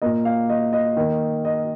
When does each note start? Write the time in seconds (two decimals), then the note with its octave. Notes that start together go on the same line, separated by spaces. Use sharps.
0.02 A#2 A#3 D#5
0.25 F5
0.50 D#5
0.73 D#5
0.97 D#3 A#3
1.45 D#5